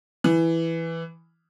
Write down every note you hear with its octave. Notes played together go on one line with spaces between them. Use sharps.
E3